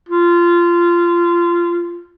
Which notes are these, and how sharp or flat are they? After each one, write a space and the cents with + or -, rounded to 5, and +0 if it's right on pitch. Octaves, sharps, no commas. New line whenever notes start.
F4 -20